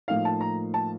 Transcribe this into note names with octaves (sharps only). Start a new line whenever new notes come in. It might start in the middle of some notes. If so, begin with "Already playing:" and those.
A2 F3 A#3 D#4 F5
A5
A#5
A5